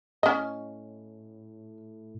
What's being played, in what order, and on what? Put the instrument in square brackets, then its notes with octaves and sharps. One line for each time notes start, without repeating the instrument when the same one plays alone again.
[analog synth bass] A2 [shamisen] C#4 D#5